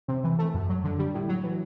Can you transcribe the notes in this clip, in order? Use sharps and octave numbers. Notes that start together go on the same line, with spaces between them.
C3
E3
A3
F#2
F#3
D3
G3
A2
F#3
E3